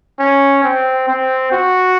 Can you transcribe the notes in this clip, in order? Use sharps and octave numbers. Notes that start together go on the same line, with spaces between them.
C#4
C4
C4
F#4